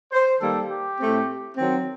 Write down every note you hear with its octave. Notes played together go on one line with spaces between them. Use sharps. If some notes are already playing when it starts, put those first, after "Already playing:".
C5
D#3 G3 A#3 A4
G4
A2 A3 C4
D#3 F#3 C4